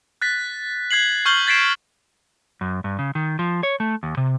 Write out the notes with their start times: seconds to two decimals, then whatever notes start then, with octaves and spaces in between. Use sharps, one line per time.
0.22 F#6 A6 B6
0.91 F#6 G#6 C7 F#7
1.26 C#6 F6 G6 C7 F#7 G7
1.47 G#6 A6 B6 C7 D7 E7
2.61 F#2
2.84 G2
2.99 C#3
3.15 D#3
3.39 F3
3.63 C#5
3.80 A3
4.03 D#2
4.17 C3